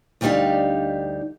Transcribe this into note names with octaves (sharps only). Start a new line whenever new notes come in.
D2 G3 D4 D#4 G4 F5